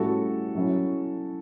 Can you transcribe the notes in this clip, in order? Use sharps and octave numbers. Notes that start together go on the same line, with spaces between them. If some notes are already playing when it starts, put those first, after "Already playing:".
Already playing: A2 G3 C#4 E4 F#4 A4
F#3 C#4 E4